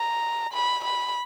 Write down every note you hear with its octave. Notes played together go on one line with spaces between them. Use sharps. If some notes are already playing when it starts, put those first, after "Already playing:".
Already playing: A#5
B5
B5